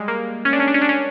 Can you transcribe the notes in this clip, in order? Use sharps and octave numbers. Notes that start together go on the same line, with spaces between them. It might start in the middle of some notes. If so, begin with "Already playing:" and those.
Already playing: G3 G#3
A#3
C#4
D4
C#4
D4
C#4
D4
C#4